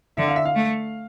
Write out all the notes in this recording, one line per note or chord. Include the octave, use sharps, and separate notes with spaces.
D3 E5
F5
E5
F5
A3